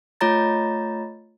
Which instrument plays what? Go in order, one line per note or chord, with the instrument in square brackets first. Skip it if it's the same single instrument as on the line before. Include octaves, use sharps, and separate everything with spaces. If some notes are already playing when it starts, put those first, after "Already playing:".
[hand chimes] A3 F4 C#5 A#5 A6